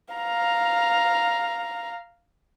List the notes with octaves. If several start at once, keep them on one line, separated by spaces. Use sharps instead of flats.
F5 A#5